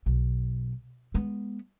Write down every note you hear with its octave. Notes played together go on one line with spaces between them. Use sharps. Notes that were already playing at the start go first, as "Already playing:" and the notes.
B1
G#3 B3